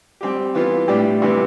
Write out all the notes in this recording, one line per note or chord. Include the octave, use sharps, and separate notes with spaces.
G3 C4 G4
E3 B3 F4
A2 G3 D4 G4
C3 E3 G3 B3